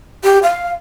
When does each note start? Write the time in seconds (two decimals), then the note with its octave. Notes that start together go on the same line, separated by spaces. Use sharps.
0.24 G4
0.43 F5